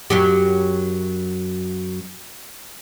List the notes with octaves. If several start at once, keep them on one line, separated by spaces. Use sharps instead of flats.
F#2 F#3 G4